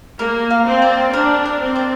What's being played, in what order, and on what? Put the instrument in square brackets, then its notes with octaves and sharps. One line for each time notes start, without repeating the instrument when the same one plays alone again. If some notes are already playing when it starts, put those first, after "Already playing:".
[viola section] A#3 [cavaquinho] A#4
[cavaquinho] F5
[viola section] C4
[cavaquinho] D5
[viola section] D4 [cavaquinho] A#4
[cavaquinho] A#4
[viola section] C4
[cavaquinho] D5